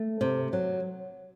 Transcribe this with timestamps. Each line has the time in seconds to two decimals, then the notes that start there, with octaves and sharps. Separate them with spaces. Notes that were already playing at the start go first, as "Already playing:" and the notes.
Already playing: A3
0.21 C3
0.53 F#3